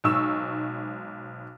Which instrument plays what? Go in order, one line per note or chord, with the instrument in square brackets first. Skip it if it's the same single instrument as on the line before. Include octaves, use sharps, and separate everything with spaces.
[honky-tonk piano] B1 G#2 C#6 E6